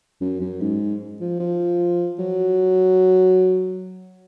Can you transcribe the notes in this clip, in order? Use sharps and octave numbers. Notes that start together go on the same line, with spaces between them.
F#2
F#2
G#2
F3
F3
F#3